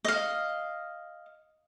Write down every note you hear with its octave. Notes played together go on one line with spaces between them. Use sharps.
D#5 F5